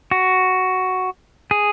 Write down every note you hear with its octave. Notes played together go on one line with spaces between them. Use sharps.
F#4
G#4